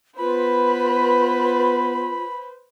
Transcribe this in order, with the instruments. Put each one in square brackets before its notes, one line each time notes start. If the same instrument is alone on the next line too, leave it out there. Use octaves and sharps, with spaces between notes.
[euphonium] B3 [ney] F4 [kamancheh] B4 C5 [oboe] B5